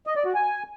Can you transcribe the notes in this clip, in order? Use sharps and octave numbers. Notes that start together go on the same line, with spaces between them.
D#5
D5
F#4
G#5